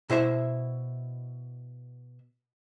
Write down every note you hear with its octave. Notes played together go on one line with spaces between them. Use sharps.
B2 E4 C5 E5